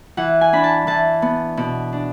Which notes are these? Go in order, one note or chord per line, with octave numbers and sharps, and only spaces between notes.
E3 F#5
G#5
D4 B5
A5
E3 A5
B3
B2
D4